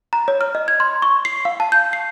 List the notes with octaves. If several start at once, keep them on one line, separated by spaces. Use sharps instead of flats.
A#5
C#5
F6
D#5
G#6
C6
C#6
C7
F5
A5
G6
C7